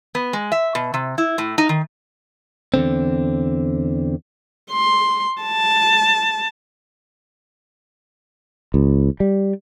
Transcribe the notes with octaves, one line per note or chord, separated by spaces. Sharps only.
B3
G#3
E5
B2
C3
E4
A2
D#4
D#3
E2 G2 D3 C4
C6
A5
C#2
G3